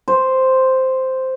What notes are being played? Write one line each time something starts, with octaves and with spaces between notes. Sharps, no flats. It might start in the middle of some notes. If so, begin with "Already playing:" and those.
C5